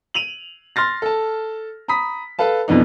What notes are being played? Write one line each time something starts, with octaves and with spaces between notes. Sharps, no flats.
D#7 F7 F#7
C6 F6 A6 A#6
A4 A5
A#5 B5 D#6 B6
A4 B4 F5 A5
F2 B2 E3 B3 D4 D#4